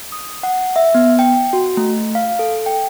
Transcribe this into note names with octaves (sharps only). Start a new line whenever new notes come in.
D#6
F#5
E5
B3
G5
F#4
A3
F5
A4
G5